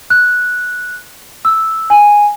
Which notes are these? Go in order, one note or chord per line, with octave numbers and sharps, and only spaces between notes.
F#6
E6
G#5